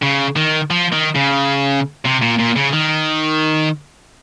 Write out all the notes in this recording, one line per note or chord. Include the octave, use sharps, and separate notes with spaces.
C#3
D#3
F3
D#3
C#3
C3
A#2
A#2
C#3
D#3